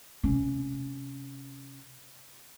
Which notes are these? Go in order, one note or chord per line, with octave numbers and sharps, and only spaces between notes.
C3 C#4